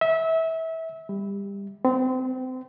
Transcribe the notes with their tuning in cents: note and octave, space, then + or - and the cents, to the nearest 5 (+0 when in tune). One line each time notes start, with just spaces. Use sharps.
E5 -25
G3 +25
C4 -30